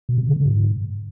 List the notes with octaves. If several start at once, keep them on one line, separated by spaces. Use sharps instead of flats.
B2
C3
D3
C#3
G#2